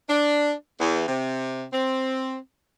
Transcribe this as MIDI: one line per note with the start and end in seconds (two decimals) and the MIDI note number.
0.10 0.53 62
0.80 1.07 40
1.08 1.63 48
1.73 2.37 60